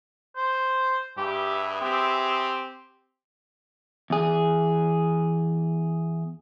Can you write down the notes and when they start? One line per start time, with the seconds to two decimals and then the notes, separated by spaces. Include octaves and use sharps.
0.37 C5
1.18 G2 B3 G4 G#4 E5
1.81 C4 G4
4.10 E2 G#4